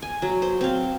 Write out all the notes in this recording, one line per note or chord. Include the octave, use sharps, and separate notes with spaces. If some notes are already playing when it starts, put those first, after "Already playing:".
G#5
F#3
C5
C4 F5